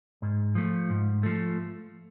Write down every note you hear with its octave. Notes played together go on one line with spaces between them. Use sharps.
G#2
F3 A3
G#2
F3 A3